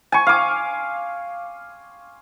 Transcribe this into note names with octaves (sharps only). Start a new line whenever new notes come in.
G#5 C#6
F5 D6